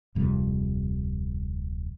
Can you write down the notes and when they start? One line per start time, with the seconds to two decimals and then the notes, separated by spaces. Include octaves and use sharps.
0.15 D1 F2 C3 G3